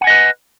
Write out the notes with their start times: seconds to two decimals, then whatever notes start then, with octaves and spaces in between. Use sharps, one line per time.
0.01 F#5
0.04 G#5
0.07 D#5
0.10 B4